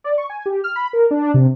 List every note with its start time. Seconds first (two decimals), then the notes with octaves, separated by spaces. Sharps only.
0.04 D5
0.18 C#6
0.30 G#5
0.46 G4
0.64 F6
0.76 B5
0.93 A#4
1.11 D4
1.34 C3